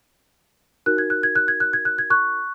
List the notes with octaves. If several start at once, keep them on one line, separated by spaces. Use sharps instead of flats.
D#4 F#4 A#4 F#6
G#6
F#6
G#6
F#6
G#6
F#6
G#6
F#6
G#6
C#6 F#6